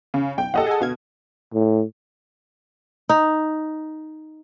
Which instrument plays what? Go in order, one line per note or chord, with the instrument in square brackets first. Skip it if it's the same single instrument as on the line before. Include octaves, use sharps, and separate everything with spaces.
[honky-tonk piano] C#3
[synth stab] B1 [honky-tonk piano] G5
[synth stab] A#1 G4 [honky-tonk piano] A4 D#5 F#5
[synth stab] G#4 G#5
[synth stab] D2 F5 G#6 [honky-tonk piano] B2
[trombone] A2
[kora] D#4